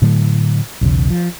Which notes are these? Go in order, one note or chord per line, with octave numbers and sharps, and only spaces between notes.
A2 D3 F#3 A3
B1 E2 C#3
F3